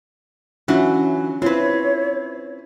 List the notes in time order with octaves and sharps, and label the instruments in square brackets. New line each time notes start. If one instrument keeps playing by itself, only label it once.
[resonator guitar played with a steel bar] E3 F#3 F#4 [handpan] C#4 D4 F4
[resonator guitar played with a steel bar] C4 B4 [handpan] E4 F4 [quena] C#5